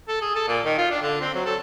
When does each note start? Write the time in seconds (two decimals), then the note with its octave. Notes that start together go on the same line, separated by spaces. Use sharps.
0.08 A4
0.21 G#4
0.36 A4
0.48 A#2
0.65 D#3
0.78 F4
0.91 D4
1.02 D3
1.21 C4
1.34 F#3
1.46 A4